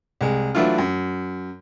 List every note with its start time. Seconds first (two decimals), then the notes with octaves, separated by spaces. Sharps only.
0.21 C2 G#3
0.55 E3 F#3 A3 D4 E4 F4
0.78 F#2